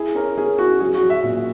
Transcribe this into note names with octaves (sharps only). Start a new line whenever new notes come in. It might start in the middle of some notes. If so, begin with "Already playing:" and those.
Already playing: E4 G#4
C#4 A#4
C#4 G#4
E4 F#4
F#3 G#4
F#4
F#3
E5
A#2